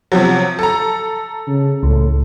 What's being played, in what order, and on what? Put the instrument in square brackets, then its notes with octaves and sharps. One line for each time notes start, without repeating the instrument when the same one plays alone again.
[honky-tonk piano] C3 F3 F#3
A4 A#5
[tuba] C#3
[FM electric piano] C#2 [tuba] A2